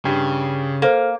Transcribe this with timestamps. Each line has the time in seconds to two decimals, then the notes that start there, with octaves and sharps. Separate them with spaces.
0.05 G2 C#3
0.82 A#3 A4 C5